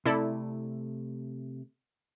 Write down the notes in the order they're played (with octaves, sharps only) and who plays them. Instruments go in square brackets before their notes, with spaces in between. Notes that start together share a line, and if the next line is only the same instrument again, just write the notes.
[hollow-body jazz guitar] C3 A3 [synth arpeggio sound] E4 A4 D5